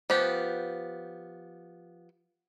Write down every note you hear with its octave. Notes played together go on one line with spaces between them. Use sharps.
F3 B3 G4